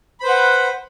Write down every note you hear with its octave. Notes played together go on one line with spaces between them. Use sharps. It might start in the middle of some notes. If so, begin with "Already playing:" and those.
B4 C5 F#5 B5